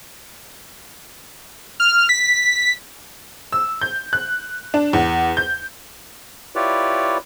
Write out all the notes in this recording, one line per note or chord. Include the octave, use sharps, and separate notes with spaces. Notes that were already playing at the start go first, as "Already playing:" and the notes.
F6
B6
E6
G6
F#6
D4
E2
G6
E4 F4 G4 B4 C#5 D5